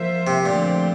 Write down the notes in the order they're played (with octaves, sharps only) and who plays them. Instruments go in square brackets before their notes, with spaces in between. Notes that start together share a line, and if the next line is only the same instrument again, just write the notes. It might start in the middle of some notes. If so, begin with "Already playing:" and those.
Already playing: [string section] F3 A#3 F4 C5 E5
[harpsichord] C3
[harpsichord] A#2 [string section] D3 F3 A3 C4 G4